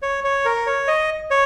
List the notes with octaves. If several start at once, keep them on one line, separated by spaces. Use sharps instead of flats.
C#5
C#5
A#4
C#5
D#5
C#5